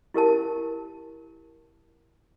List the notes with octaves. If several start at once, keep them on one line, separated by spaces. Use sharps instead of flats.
E4 G4 A#4 A5